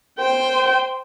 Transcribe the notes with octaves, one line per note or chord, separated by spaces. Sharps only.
C5 G5